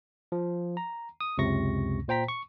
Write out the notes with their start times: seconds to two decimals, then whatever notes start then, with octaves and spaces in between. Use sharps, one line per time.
0.32 F3
0.77 A#5
1.20 D#6
1.38 C#2 F#2 C3 C#6 A#6
2.08 A#2 C5 G5 A#5 B6
2.28 C#6